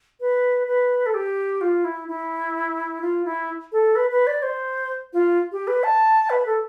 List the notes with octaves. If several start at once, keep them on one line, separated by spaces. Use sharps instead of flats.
B4
B4
A4
G4
F4
E4
E4
F4
E4
A4
B4
B4
D5
C5
F4
G4
B4
A5
B4
A4